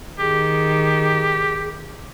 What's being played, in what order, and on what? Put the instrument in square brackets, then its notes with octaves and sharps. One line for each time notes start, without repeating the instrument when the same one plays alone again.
[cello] D#3 [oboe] G4 [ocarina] G#4